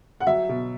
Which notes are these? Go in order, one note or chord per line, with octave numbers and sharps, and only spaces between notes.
F#5
F#3 E5
B2